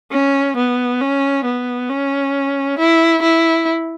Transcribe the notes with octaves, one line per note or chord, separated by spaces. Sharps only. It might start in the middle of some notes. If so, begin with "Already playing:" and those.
C#4
B3
C#4
B3
C#4
E4
E4